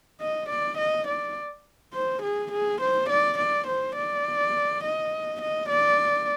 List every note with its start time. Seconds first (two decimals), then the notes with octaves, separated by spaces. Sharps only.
0.21 D#5
0.49 D5
0.78 D#5
1.08 D5
1.94 C5
2.22 G#4
2.52 G#4
2.81 C5
3.09 D5
3.39 D5
3.67 C5
3.96 D5
4.84 D#5
5.42 D#5
5.70 D5